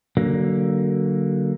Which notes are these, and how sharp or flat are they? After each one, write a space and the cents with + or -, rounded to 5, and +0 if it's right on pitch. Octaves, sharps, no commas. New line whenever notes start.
D3 +0 F#3 +30 A#3 +0